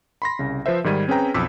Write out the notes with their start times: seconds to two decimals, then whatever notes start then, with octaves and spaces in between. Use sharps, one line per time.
0.22 B5 C6 A#6
0.39 C2 C#3
0.66 F3 B4 C5 E5
0.84 G#2 D#3 G3 G#6 D#7
1.08 C4 C#4 G#4 B4 G5 A#5
1.34 B1 F2 D6 E6 B6